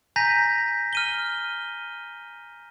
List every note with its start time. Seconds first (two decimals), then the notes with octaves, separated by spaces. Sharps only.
0.16 G#5 A#5 G6 A#6 B6
0.93 F6 D#7 G7